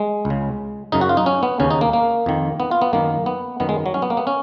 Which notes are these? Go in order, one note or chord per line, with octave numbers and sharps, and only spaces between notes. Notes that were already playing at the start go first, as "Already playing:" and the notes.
Already playing: G#3
C#2
C#3
F#2 C#3 D#4
F#4
F4
D#4
C#4
B3
D#2 C#3 C#4
D#4
A#3
A#3
F2 D#3
B3
F4
B3
F#2 D#3 A#3
B3
F#2 D#3 B3
G#3
F#3
C#4
B3
A#3
B3
C#4